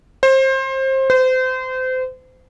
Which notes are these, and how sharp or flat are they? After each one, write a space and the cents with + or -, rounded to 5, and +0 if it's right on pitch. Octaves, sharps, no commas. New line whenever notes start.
C5 +25
C5 -30